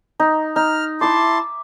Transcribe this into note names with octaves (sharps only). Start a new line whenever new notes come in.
D#4
D#4 F6
E4 E5 A5 C6 D6